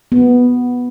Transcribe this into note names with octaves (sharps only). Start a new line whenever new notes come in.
B3